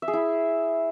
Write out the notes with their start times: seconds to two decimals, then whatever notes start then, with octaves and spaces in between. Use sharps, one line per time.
0.02 E5
0.08 G#4
0.13 E4